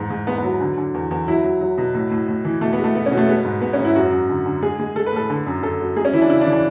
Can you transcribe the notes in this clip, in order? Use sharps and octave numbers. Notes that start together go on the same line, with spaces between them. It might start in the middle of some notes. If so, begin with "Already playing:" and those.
Already playing: E2 G#2
G#2
G#2 B3
B3
F#3
D3
D3
E2
E2
F#3 E4
F#3
F#3
B2
A2
A2
A2
E3
B2 A3
B3
G#3
A3
B2 B3
C#4
B2
A3
G#3 B3
G#2
G#2 B3
C#4
G#2
E4
F#2 F#4
F#2
D3
D3
G#3 G#4
G#3
G#3 A4
B4
A2 A4
D3
F#2
F#2 A4
F#3
G#3 G#4
C#4
E3 E4
D4
C#3 E4
D4
E3
D4